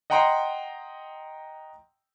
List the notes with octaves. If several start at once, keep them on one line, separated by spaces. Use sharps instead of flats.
D#5 F#5 G5 A#5 C6